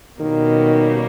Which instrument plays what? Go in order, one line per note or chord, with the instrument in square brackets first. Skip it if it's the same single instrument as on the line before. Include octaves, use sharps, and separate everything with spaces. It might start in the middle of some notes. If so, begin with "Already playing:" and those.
[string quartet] B2 G3 A#3 C#4 [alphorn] D#3